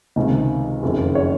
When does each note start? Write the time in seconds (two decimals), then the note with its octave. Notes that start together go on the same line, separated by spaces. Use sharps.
0.16 C#2 C3 D#3
0.83 F#1 F2 D#3
1.15 C#5